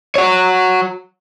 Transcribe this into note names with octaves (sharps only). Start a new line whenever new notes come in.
F#4 C#5